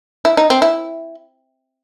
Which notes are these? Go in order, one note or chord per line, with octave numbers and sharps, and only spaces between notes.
E4
D#4
C4
E4